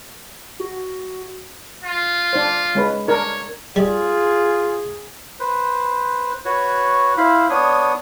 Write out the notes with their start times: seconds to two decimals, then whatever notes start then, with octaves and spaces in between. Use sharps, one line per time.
0.60 F#4
1.84 F4
2.33 D4 C5
2.75 G#3 C#4 B4
3.08 D4 A#4 C#5
3.76 G3 F4 G#4
5.40 B4 C5
6.45 F#4 B4 C#5
7.17 E4 C5 F5 B5
7.50 B3 D4 C#5 D#6